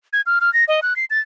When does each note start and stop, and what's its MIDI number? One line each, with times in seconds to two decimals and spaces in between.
0.13 0.21 92
0.26 0.39 89
0.41 0.52 89
0.53 0.65 94
0.68 0.80 75
0.82 0.96 90
0.96 1.05 96
1.10 1.19 93